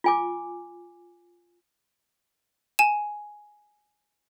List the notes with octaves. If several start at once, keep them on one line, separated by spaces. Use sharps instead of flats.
F4 G#5 D6
G#5 E7